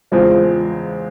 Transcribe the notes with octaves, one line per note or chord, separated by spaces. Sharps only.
E2 C#3 F3 G#3 C4